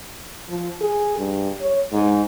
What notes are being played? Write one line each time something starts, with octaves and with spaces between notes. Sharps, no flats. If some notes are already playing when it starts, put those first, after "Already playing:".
F3
G#4
G2
C#5
G#2